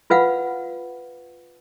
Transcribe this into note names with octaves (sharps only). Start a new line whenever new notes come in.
F4 B4 F5 F#5